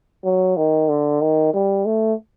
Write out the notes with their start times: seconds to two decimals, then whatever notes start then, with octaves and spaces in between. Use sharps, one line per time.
0.25 F#3
0.57 D#3
0.89 D3
1.21 D#3
1.53 G3
1.85 A3